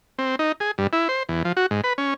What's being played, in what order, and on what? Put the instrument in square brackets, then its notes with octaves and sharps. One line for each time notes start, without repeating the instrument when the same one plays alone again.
[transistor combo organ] C4
D#4
G#4
G2
E4
C5
E2
F3
F#4
G#2
B4
C#4